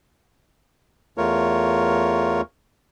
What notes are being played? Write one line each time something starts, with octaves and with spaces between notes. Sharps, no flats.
E2 A3 F4 A#4 C#5